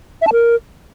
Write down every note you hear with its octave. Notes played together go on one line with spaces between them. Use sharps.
E5
A5
A#4